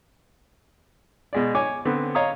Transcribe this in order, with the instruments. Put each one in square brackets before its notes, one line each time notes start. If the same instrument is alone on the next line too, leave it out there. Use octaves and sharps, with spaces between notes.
[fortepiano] B2 G#3 D5
C#5 G#5 D6
D3 B3 C4
C#5 D#5 F5 A#5 D#6